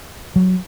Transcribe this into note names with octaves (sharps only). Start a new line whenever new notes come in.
F#3